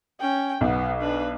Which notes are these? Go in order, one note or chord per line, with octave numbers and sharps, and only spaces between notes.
C#4 G5
B1 B3
D4 B4